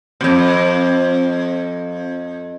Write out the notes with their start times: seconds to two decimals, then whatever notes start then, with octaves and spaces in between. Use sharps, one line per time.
0.21 F2 B2